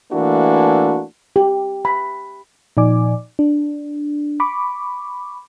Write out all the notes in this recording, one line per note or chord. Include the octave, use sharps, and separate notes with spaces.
E3 A3 A#3 D4 E4 F#4
G4
B5
A#2 F3 D#4 D5 G#5 D6
D4
B5 C#6 D6